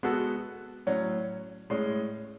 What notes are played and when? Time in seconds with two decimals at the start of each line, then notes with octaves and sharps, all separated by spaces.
0.03 G#3 B3 F#4 A4
0.87 A2 F#3 C#4
1.70 A2 G#3 C#4